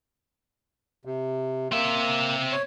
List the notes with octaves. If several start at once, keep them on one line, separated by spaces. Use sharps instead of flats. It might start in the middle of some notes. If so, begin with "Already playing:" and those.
C3
A#3 C4 E5
C#5